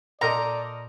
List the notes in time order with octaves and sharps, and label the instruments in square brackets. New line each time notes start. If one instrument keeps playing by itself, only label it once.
[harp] A#2 C6 G6 [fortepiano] A4 A#4 D#5 [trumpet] D5 [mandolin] A#5